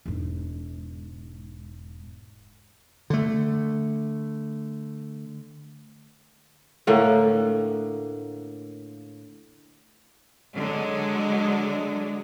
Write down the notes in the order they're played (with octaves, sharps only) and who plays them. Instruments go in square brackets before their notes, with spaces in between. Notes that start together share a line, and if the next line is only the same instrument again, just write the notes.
[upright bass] E1 G#2
[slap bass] D3 A3
[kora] A2 D3 A#3
[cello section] D3 F#3 G#3